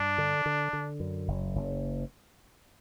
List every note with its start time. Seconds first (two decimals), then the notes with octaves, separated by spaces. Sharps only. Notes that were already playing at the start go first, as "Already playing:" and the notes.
Already playing: G2 D4
0.18 D3
0.46 D3
0.73 D3
1.00 F#2
1.28 F#1
1.55 F#1